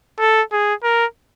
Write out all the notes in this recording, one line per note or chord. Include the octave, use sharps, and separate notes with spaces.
A4
G#4
A#4